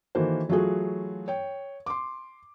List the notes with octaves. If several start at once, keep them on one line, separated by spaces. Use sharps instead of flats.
D#3 E3 A#3 F#4 A4 C5
E3 F#3 A3 F4 F#4 G#4
C#5 G5
C6 D6